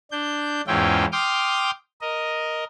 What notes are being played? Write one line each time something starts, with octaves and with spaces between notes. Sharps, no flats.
D4 G6
E2 G#2 C#4 E4 F4 G5
G5 C6 D6 D#6 F6 G6
A#4 D#5